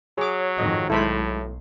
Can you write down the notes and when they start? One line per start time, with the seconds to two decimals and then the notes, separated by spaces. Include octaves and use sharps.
0.18 F#3 G#4 C#5 D6
0.58 F2 G#2 D#3 D#5
0.90 B1 A2 G#3 E4 A4 C5 B5